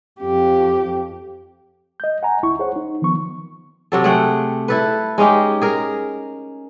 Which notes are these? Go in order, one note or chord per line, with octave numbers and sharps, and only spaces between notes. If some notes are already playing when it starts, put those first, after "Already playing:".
F2 G4
D#5 G6
F#5 G#5 A#5
D2 E4 C#6
G#4 C5 C#5 F#5
D#4
D#3 F3 B3 C#6
C3 F#3 A4
A3 G#4 F#5 G5
E4 A4 B4
G#3 C#4 D#4 G4
G#4 A#4